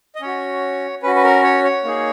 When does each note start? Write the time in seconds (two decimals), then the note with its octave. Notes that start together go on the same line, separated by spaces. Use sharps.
0.16 D#5
0.21 C#4 F#4 C#5
1.03 C#4 F#4 B4
1.15 B4
1.23 A#4
1.43 C#5
1.64 C#5
1.84 A#3 D#4 G#4